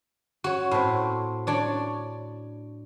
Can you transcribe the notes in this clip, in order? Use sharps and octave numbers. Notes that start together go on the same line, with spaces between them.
F#4 C#5
A2 C4
D4 C#5 D5